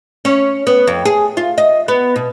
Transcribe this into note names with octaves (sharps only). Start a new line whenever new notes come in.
C#4
B3
F2
G#4
F4
D#5
B3
B2